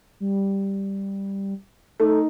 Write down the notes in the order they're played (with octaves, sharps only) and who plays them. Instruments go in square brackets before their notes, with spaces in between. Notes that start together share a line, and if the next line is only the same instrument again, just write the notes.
[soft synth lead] G3
[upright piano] A3 [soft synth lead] D#4